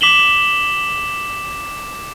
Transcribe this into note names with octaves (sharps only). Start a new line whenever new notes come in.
D6 B6 E7 F#7 G7